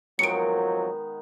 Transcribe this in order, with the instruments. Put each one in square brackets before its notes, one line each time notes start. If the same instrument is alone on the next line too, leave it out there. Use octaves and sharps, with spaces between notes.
[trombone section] F2 F3 F#3 [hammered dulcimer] D#3 G#3 B3 [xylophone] C#7 D7